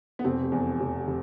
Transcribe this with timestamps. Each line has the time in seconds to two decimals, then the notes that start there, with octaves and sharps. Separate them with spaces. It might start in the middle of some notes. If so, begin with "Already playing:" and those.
0.19 B3
0.24 F1 C4
0.52 E2
0.80 F1
1.07 C3